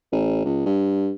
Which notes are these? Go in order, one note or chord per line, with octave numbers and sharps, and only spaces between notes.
A1
C#2
G2